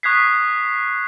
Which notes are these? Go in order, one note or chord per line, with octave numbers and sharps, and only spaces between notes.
C#6 D#6 F#6 G#6 B6 C7